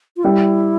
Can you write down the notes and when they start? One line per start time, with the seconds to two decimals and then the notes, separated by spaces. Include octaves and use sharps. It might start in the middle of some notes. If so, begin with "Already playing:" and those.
0.17 F4
0.24 G3 E4